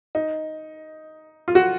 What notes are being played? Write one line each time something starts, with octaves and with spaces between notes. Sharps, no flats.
D#4
F4
F#4